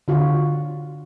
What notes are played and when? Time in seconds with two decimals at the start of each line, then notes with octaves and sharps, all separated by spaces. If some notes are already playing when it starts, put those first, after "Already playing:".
0.08 D3 F4 F#4